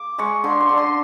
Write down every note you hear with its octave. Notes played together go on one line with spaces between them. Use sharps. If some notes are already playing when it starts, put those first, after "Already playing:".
Already playing: D6
G#3 C#6
D3 C6
C6
D3
C6